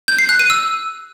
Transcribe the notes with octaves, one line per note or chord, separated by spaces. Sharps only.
G6
C7
F#6
D#7
E6